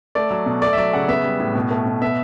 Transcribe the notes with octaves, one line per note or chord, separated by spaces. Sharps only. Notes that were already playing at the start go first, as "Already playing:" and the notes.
A3 D5
F#3
B2
A3 D5
E5
F#3 D5
C#3 F#5
B3 E5
G3
A2
B2
A3
B2
B3 E5